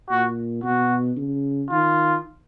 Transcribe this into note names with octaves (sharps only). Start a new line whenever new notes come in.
A#2 F#4
B2 F#4
C#3
D#3 F4